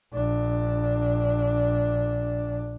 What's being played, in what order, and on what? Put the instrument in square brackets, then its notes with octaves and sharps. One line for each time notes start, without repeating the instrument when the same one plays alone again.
[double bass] A#1 D4